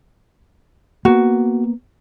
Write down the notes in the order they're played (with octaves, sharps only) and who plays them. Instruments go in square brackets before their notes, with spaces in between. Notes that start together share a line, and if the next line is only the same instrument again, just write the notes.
[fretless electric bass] A#3 B3 [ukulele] F#4